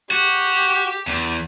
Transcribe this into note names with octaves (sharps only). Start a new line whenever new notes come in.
F#4 G4
E2